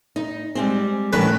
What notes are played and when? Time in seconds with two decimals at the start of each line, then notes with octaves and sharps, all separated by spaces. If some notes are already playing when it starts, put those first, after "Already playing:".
0.16 D#4
0.55 G3 G#3 C4
1.13 A2 D#3 C#4 B4